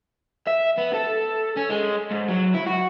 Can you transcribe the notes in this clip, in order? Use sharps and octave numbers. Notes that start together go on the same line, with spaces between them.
E5
B3
A4
C#4
G#3
G#2
F#3
E4
F#4